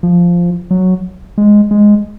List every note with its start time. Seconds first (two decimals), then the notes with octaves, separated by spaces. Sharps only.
0.03 F3
0.71 F#3
1.38 G#3
1.71 G#3